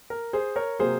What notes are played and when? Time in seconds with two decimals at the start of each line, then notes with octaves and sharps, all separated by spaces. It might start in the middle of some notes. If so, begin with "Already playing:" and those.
0.10 A#4
0.33 G#4 C5
0.56 A#4 C#5
0.79 C3 F#3 A#3 G#4 C5